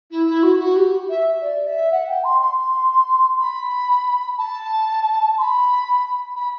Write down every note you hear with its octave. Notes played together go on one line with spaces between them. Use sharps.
E4
E4
F#4
F#4
G4
E5
D5
E5
F#5
G5
C6
C6
B5
A5
C6
B5
B5